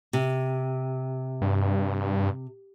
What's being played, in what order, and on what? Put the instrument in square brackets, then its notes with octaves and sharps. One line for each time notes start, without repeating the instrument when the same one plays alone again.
[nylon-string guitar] C3
[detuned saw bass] G2